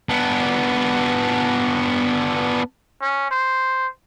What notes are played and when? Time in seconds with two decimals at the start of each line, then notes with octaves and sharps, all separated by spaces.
0.09 B3 D4
3.02 C#4
3.31 C5